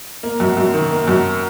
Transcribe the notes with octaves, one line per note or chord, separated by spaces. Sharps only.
A#3
F#2
F#2
D#3
A#3
F#2